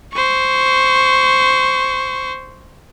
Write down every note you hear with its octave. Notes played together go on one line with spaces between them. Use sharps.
C5 C#6